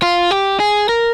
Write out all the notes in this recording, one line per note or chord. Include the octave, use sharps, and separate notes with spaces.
F4
G4
G#4
A#4